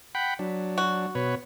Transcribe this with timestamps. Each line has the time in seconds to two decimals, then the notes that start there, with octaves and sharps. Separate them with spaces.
0.15 F#5 G5 B5
0.39 F#3 D4
0.78 F#4
1.15 B2 B4 C#5